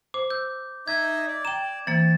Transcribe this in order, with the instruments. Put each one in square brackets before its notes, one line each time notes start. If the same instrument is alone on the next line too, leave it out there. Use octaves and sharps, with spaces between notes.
[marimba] C5 [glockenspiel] D6
[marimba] E6 [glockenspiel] G6
[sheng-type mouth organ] D#4 D#5 E5 [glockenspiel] G#6
[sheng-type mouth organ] D5
[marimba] G5 A#5 [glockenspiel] E7
[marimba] E3 A#3 [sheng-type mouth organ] C4 [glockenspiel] A6